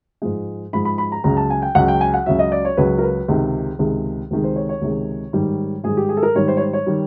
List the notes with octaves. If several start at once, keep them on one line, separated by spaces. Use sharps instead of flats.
G#2 F3 G#3
G#2 F3 G#3 B5
B5
B5
A#5
C#2 C#3 F#3 A#5
A5
G#5
G5
C#2 C#3 F#3 F#5
G5
G#5
F#5
C#2 C#3 F#3 E5
D#5
D5
C#5
C#2 C#3 F#3 B4
A#4
B4
C#2 C3 D#3 G#3
C#2 C3 D#3 G#3
C#2 C3 D#3 G#3
C5
C#5
C#5
C#2 C3 D#3 G#3
G#2 D#3 G3
G#2 D#3 G3 G#4
G4
G#4
A4
A#4
G#2 D#3 G3 C#5
C5
C#5
C5
C#5
D#3 G3